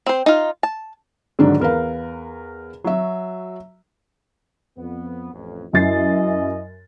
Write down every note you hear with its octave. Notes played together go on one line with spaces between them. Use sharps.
C4 C5
D#4 F4
A5
G#2 D3 D#3 F#3 D4
E2 A#4 B4 F5
F#3 F#4 E5
F2 B3
A1 F2
F#2 E4 D#5 A6 C7